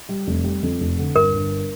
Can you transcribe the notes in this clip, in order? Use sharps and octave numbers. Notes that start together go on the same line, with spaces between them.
G3
F1
G3
F2
F1
D3
G1 A#4
G1